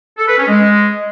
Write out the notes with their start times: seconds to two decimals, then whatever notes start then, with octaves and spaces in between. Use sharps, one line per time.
0.18 A4
0.28 B4
0.38 C#4
0.48 G#3